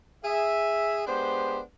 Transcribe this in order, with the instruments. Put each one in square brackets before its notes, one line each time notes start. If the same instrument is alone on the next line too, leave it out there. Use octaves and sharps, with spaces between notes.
[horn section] G#4 E5
G#3 B3 D4 G4 C5